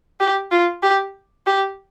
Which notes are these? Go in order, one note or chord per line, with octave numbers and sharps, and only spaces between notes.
G4
F4
G4
G4